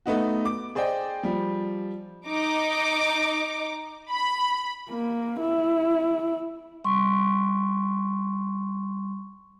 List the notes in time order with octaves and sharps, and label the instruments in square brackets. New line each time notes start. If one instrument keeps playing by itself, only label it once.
[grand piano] A3 B3 D#4 F#4
D6
G#4 C5 D5 D#5 G5
F3 G3
[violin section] D#4 D6
B5
[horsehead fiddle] A#3
E4
[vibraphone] G3 C6 C#6